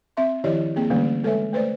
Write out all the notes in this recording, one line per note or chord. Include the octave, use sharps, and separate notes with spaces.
C4 E5 C6
D#3 F3 E4 G4 D5 D#5
A#3 C4 G#4 G5
D3 E3 G3 A3 A#3 C#4
G#3 A4 B4 C#5 E5 G#5
A3 B4 C5 D5